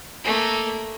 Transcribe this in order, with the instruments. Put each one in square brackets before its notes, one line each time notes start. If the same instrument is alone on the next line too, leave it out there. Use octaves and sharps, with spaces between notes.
[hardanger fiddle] A3 A#3